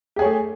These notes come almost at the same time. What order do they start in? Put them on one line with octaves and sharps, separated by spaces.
G4 G#4 C#5 A3